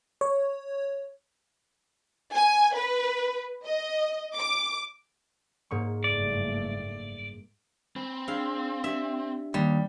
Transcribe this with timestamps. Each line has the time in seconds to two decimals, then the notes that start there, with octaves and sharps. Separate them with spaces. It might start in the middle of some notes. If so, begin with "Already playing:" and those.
0.21 C#5
2.34 G#5
2.74 B4
3.64 D#5
4.35 D6
5.71 G#2 A#3 C#6
6.04 F#1 G2 A3 D5
7.96 C4 B5
8.28 D4 G#4 F5 E6
8.84 D4 G4 E5
9.54 D#2 G3